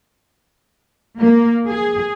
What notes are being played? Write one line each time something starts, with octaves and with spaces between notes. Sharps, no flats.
A#3
G#4